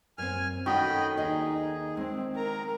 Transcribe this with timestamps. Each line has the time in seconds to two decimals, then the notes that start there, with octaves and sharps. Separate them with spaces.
0.18 F#2 C4 G#5 F6
0.66 D#3 A3 C#4 F#4 D#5 G5 B5
1.17 D#2 D#4 G#4 D5 D#5
1.97 G#3 C4
2.36 A#4 A#5